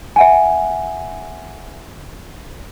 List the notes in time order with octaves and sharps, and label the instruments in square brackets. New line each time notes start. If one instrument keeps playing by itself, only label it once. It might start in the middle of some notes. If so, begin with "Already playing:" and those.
[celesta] E5 F#5 G#5